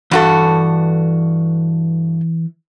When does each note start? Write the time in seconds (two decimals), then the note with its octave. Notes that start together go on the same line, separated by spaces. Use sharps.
0.11 G2 E3 F#4 A4 B5